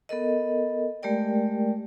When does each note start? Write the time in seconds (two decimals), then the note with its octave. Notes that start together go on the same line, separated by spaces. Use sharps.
0.09 B3 A4 A#4 D#5
1.03 G#3 A3 G4 A#4 D5 G5